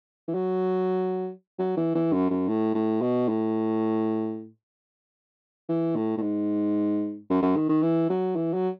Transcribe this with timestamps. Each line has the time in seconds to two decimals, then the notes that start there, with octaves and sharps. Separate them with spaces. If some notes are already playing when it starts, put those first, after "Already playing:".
0.28 E3
0.34 F#3
1.59 F#3
1.77 E3
1.95 E3
2.12 F#2
2.30 F#2
2.48 A2
2.75 A2
3.01 B2
3.29 A2
5.69 E3
5.96 A2
6.17 A2
6.22 G#2
7.30 F#2
7.42 F#2
7.56 D#3
7.69 D#3
7.82 E3
8.10 F#3
8.36 E3
8.54 F#3